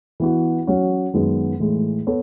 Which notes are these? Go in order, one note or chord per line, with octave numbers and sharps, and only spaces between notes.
E3 B3 F#4
F#3 C#4 F#4
F#2 D#3 G#3 B3
A2 E3 G#3
B3 A4 C#5